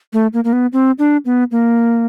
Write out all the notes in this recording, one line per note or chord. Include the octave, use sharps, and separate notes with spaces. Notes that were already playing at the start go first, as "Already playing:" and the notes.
A3
A#3
A#3
B3
C4
D4
B3
A#3